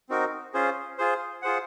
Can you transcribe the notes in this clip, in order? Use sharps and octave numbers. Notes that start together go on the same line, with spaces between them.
C4 D#4 F#4 A#4
C#4 F4 G#4 C5
F4 G#4 C5
F4 G#4 C5 F#5